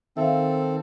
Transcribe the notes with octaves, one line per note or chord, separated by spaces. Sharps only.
D#3 C4 A4 E5 F5